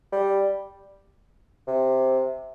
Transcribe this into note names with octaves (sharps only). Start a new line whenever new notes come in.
G3
C3